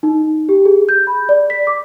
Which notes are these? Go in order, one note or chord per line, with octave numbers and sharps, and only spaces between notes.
D#4
G4
G#4
G6
B5
D5
B6
D6